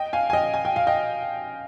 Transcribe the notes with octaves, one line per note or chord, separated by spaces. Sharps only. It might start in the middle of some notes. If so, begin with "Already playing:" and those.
Already playing: D#5 G5
F5 G#5
G#5
D#5 G5
G#5
G5
F5
D#5 G5